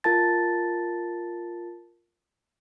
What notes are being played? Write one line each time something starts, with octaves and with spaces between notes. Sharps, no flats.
F4 A#4 A5 A6